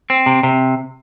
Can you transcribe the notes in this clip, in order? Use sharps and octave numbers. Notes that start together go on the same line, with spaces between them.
C4
C3
C3